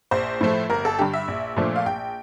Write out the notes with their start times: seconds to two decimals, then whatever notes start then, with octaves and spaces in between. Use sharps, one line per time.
0.11 A#1 C5
0.41 A2 F3 A3
0.70 G1 A#4
0.85 A4
0.99 G2 D3 G4
1.13 E5
1.28 A#1
1.57 A#2 F3 A3 D4
1.76 F5
1.86 A#1 G5